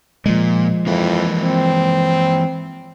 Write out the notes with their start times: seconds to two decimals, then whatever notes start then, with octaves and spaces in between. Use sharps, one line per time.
0.26 A#2 F3 G#3
0.87 F2 E3 A#3 E4
1.43 C4